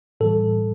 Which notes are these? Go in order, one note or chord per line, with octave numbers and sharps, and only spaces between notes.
A2 E3 G3 A4